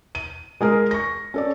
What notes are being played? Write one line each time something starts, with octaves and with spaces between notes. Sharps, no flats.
D#7
G#3 G#4 A#4
C#6 A#6
C#4 A4 D5